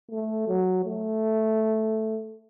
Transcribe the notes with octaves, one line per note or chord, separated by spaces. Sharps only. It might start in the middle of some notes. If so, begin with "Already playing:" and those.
A3
F#3
A3